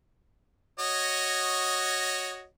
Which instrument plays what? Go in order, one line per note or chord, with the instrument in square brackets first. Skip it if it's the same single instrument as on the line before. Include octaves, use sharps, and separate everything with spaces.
[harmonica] F#4 C#5 D#5